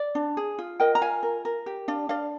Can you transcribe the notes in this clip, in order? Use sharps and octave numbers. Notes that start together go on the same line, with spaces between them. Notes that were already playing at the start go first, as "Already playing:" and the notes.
Already playing: D5
D4
G#4
F4
A#4 D#5 G5
A#5
F4 F5 G#5
A#4
A#4
G4
D4 D5 F5
D4 D5 F5